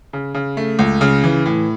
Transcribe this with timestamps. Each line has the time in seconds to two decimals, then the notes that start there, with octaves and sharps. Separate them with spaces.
0.13 C#3
0.34 C#3
0.57 A3
0.79 C#2
1.01 C#3
1.24 E3
1.45 A2